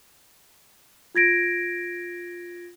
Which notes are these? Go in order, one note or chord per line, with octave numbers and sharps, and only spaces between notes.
F4 G#6 A#6 D7